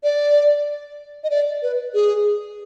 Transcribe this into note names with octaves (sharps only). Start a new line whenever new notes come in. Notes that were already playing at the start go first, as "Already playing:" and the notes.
D5
D#5
D5
B4
G#4